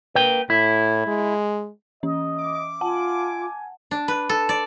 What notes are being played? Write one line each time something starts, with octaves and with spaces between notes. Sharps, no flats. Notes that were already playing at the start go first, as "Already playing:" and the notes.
A#3 B4 G5
A2 E4
G#3
E3 C#4 D#5
E5 D6
F4 F#5 G#5 A5
D4
B4
A4
D5